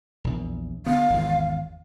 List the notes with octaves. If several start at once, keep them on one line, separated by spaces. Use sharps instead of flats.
A#1 E2
D3 B3 F5
G#1 E2